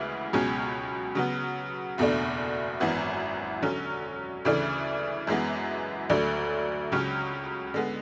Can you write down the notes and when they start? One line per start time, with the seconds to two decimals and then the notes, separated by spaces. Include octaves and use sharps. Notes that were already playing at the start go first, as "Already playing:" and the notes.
Already playing: D2 C#3 E3 G#3 B3
0.33 C#2 B2 F#3 C#4 G#4
1.15 C#3 F#3 B3
1.98 F#1 E2 B2 A3 D4
2.80 G#1 F#2 E3 B3
3.62 D3 F#3 C#4
4.45 D2 C#3 E3 A3 D4
5.27 F#2 E3 G#3 B3
6.10 D2 D3 F#3 A3 D4
6.92 C#2 C#3 F#3 C#4
7.74 D3 G#3 B3